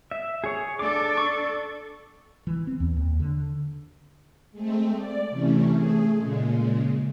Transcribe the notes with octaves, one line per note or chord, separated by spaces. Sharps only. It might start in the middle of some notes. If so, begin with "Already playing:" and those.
E5
G#4 C#5
D4 A4 D6
C#6
E3
C4
E2
D#2
D3
G#3 A3 C4
D5
C3 E3 A3 C#4
A3 G#4
A#2 C#3 G#3